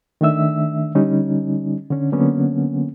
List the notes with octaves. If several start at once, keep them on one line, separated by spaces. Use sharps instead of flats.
D#3 A3 D4 E5 E6
D3 G3 C#4 D#4
D3 C#4
D3 F#3 A#3 B3 C#4